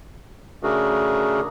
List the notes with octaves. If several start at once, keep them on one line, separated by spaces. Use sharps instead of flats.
C#3 A3 D4 F#4 G#4 A#4